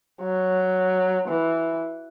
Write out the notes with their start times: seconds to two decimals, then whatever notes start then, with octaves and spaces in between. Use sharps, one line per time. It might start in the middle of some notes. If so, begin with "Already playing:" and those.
0.22 F#3
1.28 E3